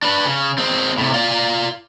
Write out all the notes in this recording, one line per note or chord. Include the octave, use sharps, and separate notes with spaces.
D4 B4
C#3
G#3 C4
A2 C3
F4 D5